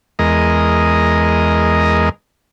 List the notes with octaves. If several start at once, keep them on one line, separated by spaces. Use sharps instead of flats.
E2 G#3 A#4 D#5